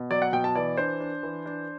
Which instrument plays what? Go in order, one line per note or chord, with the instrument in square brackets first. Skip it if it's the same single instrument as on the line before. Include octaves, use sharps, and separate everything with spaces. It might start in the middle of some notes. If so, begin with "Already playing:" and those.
Already playing: [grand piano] B2
F#3 D5
F#5
B2 G5
A5
E3 D5
D4 C5
D4
E3
D4